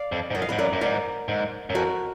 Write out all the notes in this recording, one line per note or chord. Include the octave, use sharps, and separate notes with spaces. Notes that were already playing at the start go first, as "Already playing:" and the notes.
Already playing: D5 F5
F2
G#2
F#2 D#5
F5
G#2 B4 D#5
F#2 A#4 D5
F#2
G#2 A#4 D5
G#2
F#2
F2 F#4 A#4